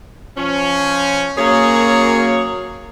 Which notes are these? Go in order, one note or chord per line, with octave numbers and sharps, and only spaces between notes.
F3 C#4
F#2 A#3 G#4 C#5